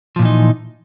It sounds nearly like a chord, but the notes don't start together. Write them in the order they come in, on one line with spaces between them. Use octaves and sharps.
F3 A#2 E3 D#4